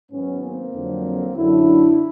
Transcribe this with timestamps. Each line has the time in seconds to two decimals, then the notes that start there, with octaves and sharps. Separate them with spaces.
0.10 G#2 D#3 F#3 B3 C#4
0.42 A#3 C4
0.73 F2 D3 F#3
1.35 F#2 D3 F#3 D4 E4